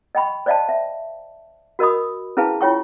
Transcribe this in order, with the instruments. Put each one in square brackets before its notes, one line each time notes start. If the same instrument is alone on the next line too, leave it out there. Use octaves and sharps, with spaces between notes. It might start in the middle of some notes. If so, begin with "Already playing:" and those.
[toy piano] D#5 G5 B5 C#6
C5 D5 D#5 F5 G5 A5
E5
F#4 A#4 D#5 B5 D#6
C#4 E4 G#4 B4 F5 A5
E4 F4 C#5 G5 C#6